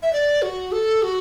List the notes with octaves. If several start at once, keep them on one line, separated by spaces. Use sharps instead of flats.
E5
D5
F#4
A4
F#4